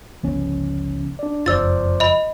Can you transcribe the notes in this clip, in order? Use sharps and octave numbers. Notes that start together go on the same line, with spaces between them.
G1 C#2 F3 B3 C#4
D4 D5
F#1 F2 F4 C5 D5 E6 A6
D#5 B5